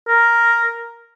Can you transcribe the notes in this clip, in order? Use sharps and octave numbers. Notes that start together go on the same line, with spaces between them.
A#4